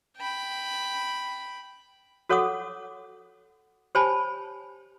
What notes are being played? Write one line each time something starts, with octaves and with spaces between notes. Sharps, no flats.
G5 B5
F#4 A4 C#5 F#5 D6 D#6
G4 C5 C#5 G#5 A5 B5